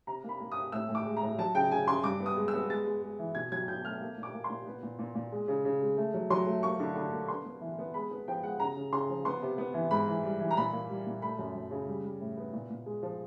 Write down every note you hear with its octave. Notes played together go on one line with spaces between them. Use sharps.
C3 A#5
A#3
B5
A#3
C3 D#6
A2 E6
A2
D6
G#3
A#5
A2
F#3 A5
C#3 G5
C#3 G#5
C#3 C6
G2 D6
B3
D#6
G#3
E6
B3
G#3 A6
G#3
G#3
E3
B2 G#6
F#3 G#6
B2 G6
A3 F6
A#3
A#2
D6
A#3
C6
A#2
B3
A#2
A#2
A#2
G#3
C#3
C#3
G#3
A3
F#3
F#3 C6
A3
A#3 C#6
D3
D3
A#3
B3 C6
B3
E3
B3
G#3 B5
B3
F3 G5
G#3 F#5
C#3 A#5
C#3
C#3 C6
F3
B3 C6
C3
B3
E3
G#2 B5
E3
G3
E3
A#5
A#2 B5
A#3
G3
A#2
A3 B5
F#2
F#2
C#3
G3
G3
A2
B3
A#2
A#2
G#3
F3